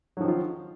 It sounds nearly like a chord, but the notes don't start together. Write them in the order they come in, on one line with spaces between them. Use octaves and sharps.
F#3 F3 D#3 F4